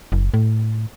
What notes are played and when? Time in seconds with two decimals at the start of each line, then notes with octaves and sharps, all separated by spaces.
0.12 F#1
0.34 A2